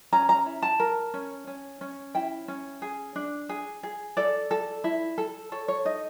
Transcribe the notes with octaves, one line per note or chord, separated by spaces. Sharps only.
C#4 A#5
A#5
E4
A5
A#4
C#4
C#4
C#4
E4 G5
C#4
G#4
D4
G#4
G#4
A4 D5
A4
E4
A4
A4 C#5
C#5
D#4 D#5